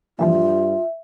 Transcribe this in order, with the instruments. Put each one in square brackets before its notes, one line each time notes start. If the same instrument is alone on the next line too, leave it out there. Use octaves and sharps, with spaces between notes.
[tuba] G2 [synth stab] A#2 E3 F3 [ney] F4 [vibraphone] E5